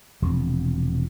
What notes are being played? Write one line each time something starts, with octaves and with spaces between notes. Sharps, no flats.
E1 C3 F3